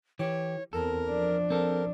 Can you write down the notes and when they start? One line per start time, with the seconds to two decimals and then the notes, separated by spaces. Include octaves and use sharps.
0.19 E3 G4 C#5
0.73 E2 C4 A4 A#4
1.08 F3 D4
1.50 C4 A4 A#4